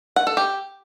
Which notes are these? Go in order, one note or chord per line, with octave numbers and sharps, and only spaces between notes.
F#5
A4
G4